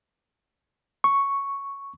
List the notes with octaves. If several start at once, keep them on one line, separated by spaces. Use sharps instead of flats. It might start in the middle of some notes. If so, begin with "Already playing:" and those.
C#6